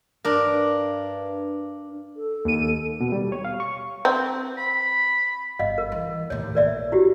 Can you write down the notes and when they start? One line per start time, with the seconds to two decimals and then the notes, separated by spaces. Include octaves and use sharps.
0.25 G2 D4 A#4
2.17 A4
2.45 D#2 D#7
3.01 B2
3.12 G3
3.32 C#5
3.45 F5
3.60 C#6
4.05 C4
4.57 B5
5.59 G1 D#5 F5
5.78 A#4
5.92 E3
6.30 D#2 A2 C#5
6.55 A#1 F2 A#4 D5 E5
6.92 E4 F#4 G4